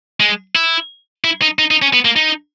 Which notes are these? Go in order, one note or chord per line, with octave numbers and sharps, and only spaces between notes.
G#3
E4
E4
D#4
D#4
D#4
C#4
B3
A#3
D#4